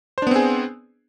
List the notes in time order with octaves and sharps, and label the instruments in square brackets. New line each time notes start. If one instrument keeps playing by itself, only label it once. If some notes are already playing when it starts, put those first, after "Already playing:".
[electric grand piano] C5
D4
B3
C4
G#4